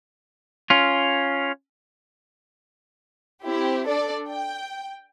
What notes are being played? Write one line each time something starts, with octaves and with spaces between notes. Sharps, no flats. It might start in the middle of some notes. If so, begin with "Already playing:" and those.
C#4 F4
C4 E4 G4
D4 A4 D5
G5